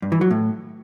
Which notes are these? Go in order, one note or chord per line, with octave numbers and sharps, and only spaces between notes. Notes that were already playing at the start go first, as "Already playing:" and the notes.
G2
E3
F#3
A2